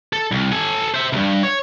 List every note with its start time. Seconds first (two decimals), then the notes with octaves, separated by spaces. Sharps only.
0.13 A4
0.32 C2
0.52 A4 G#5
0.94 C5 E5
1.13 C#2 G2
1.43 C#5